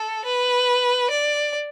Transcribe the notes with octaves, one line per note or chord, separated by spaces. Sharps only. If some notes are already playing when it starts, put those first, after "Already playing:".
Already playing: A4
B4
D5